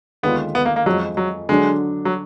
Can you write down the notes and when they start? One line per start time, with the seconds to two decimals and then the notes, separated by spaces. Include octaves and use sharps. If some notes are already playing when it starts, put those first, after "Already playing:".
0.23 D#2 D3 G#3 B3 D4 F4
0.55 B3
0.65 A#3
0.76 A#3
0.86 F2 F3 F#3 G#3
1.17 F#3
1.49 D3 F#3 G#3 D4
2.05 F#3